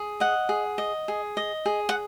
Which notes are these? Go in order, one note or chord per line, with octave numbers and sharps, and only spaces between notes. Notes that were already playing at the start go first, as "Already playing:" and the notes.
Already playing: G#4
D#5 F#5
G#4
D#5
G#4
D#5
G#4
F#5